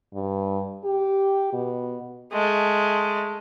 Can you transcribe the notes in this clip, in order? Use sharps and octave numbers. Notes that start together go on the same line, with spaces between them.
G2
G4
B2
G#3 A3